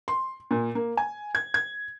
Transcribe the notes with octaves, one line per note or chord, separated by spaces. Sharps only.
C6
A#2
A#3
G#5
G#6
G#6